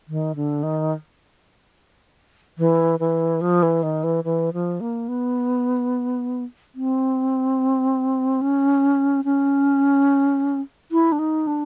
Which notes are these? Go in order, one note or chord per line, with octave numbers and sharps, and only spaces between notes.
D#3
D3
D#3
E3
E3
F3
E3
D#3
E3
E3
F3
A#3
B3
C4
C#4
C#4
E4
D4
D#4
D4